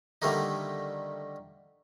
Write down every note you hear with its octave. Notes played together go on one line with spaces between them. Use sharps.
D3 D#3 G3 A3 A#3 D#4